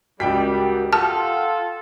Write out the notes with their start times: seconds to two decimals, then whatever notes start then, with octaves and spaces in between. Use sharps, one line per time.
0.20 C#2 G3 F#4 G4 A#4 G5 B6
0.93 F4 A4 F#5 G5 A5 F6